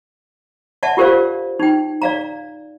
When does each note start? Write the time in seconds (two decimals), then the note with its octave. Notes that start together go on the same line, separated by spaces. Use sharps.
0.83 D5 E5 F#5 A5
0.97 F4 G4 A#4 C5 D5 F5
1.59 D#4 G5
2.02 D5 F5 A#5